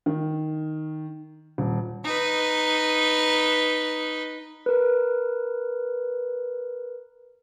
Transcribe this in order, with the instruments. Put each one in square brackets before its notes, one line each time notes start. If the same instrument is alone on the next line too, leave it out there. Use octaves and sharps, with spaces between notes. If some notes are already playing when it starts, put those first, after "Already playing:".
[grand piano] D#3
D#1
[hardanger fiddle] D#4 B4
[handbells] A#4 B4